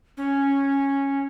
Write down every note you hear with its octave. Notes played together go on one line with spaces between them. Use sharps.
C#4